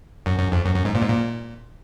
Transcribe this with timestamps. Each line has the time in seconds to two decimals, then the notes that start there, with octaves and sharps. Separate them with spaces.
0.26 F#2
0.39 F#2
0.52 F2
0.65 F#2
0.75 F#2
0.85 G#2
0.95 A#2
1.02 G#2
1.10 A#2